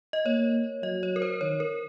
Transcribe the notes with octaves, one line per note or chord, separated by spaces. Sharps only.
D#5
A#3 C#5
F#3 D#5
C#5
A#4
C5
D#3 C#5
A#4